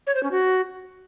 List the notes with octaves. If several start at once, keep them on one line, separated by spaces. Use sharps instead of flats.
C#5
C5
C#4
F#4